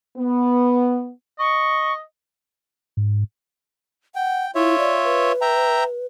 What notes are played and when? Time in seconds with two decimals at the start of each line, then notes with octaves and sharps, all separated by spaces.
0.17 B3
1.39 D#5 C#6
2.97 G#2
4.15 F#5 G5
4.55 E4 F4 C#5 E5
4.78 D5
5.04 B4
5.41 E5 G5 A#5